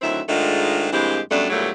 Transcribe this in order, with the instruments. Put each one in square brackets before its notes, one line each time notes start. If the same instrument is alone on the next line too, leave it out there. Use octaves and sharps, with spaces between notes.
[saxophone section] D2 D#3 F#3 C4 E4 E5
G#2 D#3 G#3 A3 D4 F4
G2 E3 G#3 A#3 C4 G4
F#2 B2 G3 A3 D4
E2 G2 A#2 F#3 A3 G4